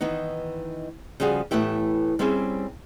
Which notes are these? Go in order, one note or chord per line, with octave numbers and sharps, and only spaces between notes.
D#3 E3 B3 D#4
C#3 F3 G3 F#4 G#4
A2 E3 A3 B3 E4 G4
G3 C4 C#4 E4 G#4